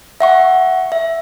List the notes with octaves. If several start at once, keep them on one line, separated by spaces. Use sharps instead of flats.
E5 F#5 C#6
E5